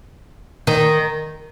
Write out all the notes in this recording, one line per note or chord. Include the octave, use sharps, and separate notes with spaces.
D#3